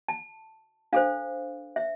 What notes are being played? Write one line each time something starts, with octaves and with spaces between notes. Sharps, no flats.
A5
D4 A4 C5 F5
E5